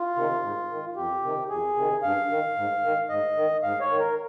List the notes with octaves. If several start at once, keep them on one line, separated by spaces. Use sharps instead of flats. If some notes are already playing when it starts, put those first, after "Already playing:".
Already playing: F4
C3 D#3
G#2
D#3
F2 G4
C3 D#3
F2 G#4
C3 D#3
G2 F5
D#3
G#2
D#3
G#2 D#5
D#3
G#2 F5
C#5
D#3
A#4